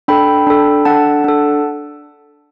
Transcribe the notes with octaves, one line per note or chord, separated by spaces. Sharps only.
D4 A4 G5 B5
D4 A4
D4 A4 F#5 A5
D4 A4